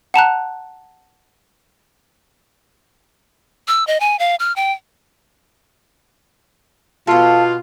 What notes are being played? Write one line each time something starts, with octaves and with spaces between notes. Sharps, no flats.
F#5 A5 A#5 F#6
E6
D#5
G#5
F5
F6
G5
B2 F4 A4 F5